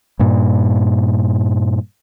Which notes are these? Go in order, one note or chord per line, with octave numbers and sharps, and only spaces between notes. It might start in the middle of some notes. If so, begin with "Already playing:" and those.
G2 A#2